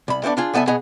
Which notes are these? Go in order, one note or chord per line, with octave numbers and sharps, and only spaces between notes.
C2 B5
A3 B3 C4 D4
D4 F4 G#4
C2 B3 A4 E5 G#5
B2 B3 G#4 D#5